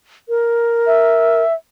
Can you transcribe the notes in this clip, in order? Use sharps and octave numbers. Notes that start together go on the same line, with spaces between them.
A#4
E5